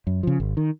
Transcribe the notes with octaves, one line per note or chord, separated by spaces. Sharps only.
F#2
C#3 F3
G#1
D#3